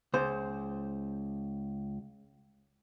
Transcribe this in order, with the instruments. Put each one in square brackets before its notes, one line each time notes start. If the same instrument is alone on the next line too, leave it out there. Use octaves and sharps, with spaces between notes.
[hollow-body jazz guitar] C#2 C5